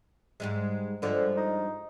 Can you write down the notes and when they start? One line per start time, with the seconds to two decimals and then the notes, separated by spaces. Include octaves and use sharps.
0.40 G#2 G3 G#3
1.02 G2 D3 F3 G#3
1.37 D#4